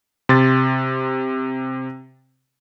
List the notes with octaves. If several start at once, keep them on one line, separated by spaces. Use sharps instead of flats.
C3 C6 G#6 A6